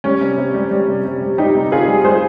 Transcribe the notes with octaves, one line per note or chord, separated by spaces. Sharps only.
G3 C#4
C3
C3
G3
G3
C3
C3
G3
G3 D#4 G4
C3
C3 F4 G#4
G3
G3 G#4 C5